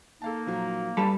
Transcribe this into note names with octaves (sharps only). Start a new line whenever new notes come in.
A#3 D#4 A4 F5 A5
A#2 F3 F#3
G2 G3 A4 A5 B5